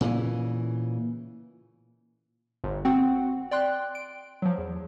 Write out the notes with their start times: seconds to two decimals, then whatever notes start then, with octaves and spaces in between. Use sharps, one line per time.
0.01 A#2 C#3 E3
2.64 G1
2.85 C4 F#4 F#5
3.51 D5 G5 C6 F#6
3.95 D7
4.42 F3 F#3
4.58 E2